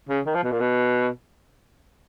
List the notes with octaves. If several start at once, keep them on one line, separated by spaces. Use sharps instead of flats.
C#3
D#3
F3
B2
A#2
B2